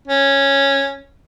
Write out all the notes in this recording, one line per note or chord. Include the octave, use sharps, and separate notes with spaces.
C#4